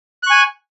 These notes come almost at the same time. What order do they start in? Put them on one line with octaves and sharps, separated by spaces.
F#6 C#6 G#5